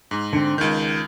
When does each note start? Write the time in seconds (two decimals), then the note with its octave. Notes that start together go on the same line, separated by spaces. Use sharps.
0.11 G#2
0.33 D3 C4
0.58 C#2 D#3 G6